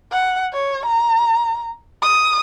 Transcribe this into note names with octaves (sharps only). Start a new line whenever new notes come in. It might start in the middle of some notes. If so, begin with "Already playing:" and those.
F#5
C#5
A#5
D#6